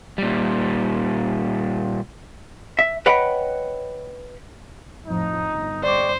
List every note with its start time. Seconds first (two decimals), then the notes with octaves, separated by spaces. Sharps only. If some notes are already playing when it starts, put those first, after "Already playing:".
0.18 A#2 G3
2.79 E5
3.06 B4 C#5 D#5 F#5 G5 B5
5.06 F2 A2 F3 D#4
5.50 G1
5.84 G#3 C4 C5 D5 C#6 D6